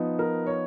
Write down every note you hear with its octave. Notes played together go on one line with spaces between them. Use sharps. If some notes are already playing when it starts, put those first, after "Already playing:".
Already playing: F3 B3 D#4
A#4
C#5